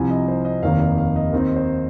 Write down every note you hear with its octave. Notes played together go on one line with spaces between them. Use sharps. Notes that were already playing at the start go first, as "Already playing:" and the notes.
Already playing: C2 C3 F3 G#5
D#5
C5
D#5
F1 D#2 D#3 A#3 D#4 F5
F5
F5
D#5
D#2 D#3 C4 D#4 A#4
C5